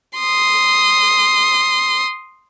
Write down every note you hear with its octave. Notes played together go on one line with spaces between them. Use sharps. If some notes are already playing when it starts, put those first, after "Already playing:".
C6 D#6